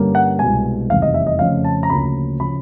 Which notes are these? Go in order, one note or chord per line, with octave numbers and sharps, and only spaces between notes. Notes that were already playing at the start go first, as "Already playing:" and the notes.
Already playing: G2 D3 G3 A#3 C#4
F#5
C2 B2 G#3 G#5
F1 E2 C3 D#3 G3 F5
D#5
E5
D#5
F2 C#3 F3 A3 C#4 F5
A5
A#5
D2 C#3 F3 A#3 C#4 B5
C#3 F3 B5